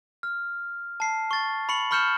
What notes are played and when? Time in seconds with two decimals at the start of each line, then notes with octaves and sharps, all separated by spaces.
0.23 F6
1.00 A5 C7
1.31 C#6 A6
1.69 B5 C#6 C#7 F#7
1.91 B5 C#6 F6 G6 C#7 E7